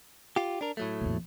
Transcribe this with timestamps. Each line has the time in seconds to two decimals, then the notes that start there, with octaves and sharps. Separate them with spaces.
0.36 F4 G4
0.61 D4 A#4
0.77 A2 F#3 A3
1.01 F2 A#2